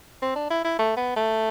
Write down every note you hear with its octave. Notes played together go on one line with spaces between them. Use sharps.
C4
D4
E4
E4
A3
B3
A3